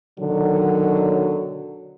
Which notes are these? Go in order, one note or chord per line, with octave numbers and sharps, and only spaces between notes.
B2 D3 D#3 F#3